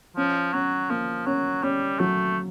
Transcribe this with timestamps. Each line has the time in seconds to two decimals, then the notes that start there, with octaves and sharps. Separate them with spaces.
0.16 F3 C#4
0.53 F#3 C#4
0.90 F3 A#3
1.26 F#3 C#4
1.63 G3 C#4
1.99 F#3 A3